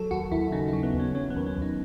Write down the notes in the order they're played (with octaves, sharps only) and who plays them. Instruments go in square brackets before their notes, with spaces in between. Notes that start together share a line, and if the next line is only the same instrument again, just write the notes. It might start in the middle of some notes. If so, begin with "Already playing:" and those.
Already playing: [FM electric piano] F#3 A4
D#2 F#4
D#2 E4
C#3 D#4
F#3 E4
B3
D#2
C#4
F#3 C#4
B3
D#2
C#4
D#2 D#4